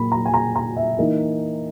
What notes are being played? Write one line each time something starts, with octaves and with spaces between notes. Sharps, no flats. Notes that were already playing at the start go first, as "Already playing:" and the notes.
Already playing: A#2 F#3 A#3 B5
A#5
G#5
A#5
A#5
E5
E3 A#3 D#4